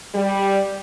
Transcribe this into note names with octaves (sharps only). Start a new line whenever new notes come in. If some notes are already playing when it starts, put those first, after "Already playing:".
G3